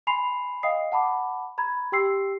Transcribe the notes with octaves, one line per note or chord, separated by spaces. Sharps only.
G#5 B5 C6 C7 F7
D#5 F5 G5 D#6 C7
F#5 A5 B5 D6
A#5 B5 G#6
G4 G5 C6 E6 C7